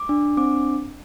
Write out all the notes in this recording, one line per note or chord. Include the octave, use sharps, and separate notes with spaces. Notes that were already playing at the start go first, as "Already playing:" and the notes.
Already playing: D6
D4
C4 D6